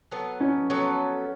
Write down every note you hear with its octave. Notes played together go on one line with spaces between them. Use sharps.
F#3 B3 A4
C#4
F#3 B3 A4